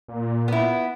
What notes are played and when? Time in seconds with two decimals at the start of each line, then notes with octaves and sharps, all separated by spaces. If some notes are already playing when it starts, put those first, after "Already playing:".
0.08 A#2
0.48 B3 E4